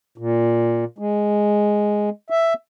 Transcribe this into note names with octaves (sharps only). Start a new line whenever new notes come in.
A#2
G#3
E5